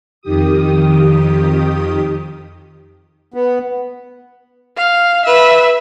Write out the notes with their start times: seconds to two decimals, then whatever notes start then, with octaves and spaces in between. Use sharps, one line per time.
0.21 F2 D#3 G4 D#6
3.34 B3
4.77 F5
5.25 B4 E5